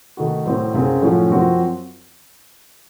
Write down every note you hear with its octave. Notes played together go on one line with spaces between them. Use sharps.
D#3 A3 D#4 F#4
A2 F#3 C4
F#2 C#3 F#3 C4
A2 F3 A3 C#4 F#4
F#2 F3 C4 F#4